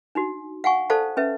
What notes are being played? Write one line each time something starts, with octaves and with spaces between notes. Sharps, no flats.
D4 D#4 F#4
F5 F#5 G#5 C#6
A4 C5 D5 F5 A5
C#4 B4 E5